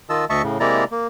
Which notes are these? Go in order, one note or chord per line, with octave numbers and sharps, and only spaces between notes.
D#3 F4 D#5 A5 E6
D2 D#5 E5 A5 C#6
A2 C#3
C3 G#3 A#3 E4 D5 A#5
A#3